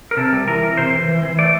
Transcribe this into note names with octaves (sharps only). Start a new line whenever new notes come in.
A#4
C3 A4
G3
E3 A#4
E3
C3 C5
E3
E3
E3
A3 D5